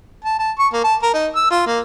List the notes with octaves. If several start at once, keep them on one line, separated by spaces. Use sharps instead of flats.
A5
A5
C#6
A#3
A5
A#4
D#4
E6
F4
A#3